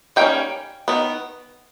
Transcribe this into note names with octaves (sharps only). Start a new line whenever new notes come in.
D#3 G3 A#3 C#4 G5
D#3 F#3 B3